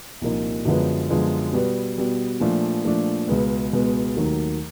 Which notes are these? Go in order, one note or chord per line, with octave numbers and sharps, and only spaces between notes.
C2 A#2 F3 A#3 D#4
F#2 D3 F3 G#3 B3
F#2 D3 F3 G#3 B3
B2 G3 B3
B2 G3 B3
A#2 F3 A3 D4
A#2 F3 A3 D4
C#2 B2 G#3 B3
C#2 B2 G#3 B3
D#2 D#3 F#3 A3